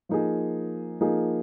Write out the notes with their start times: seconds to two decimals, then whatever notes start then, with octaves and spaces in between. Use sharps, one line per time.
0.09 F3 A#3 D#4 G#4
1.01 F3 A#3 D#4 G#4